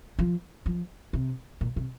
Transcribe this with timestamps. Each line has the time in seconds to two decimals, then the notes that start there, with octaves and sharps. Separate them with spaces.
0.19 F3
0.66 F3
1.13 C3
1.61 A#2
1.76 C3